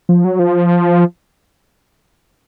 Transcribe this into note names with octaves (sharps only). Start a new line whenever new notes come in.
F3
F#3
F3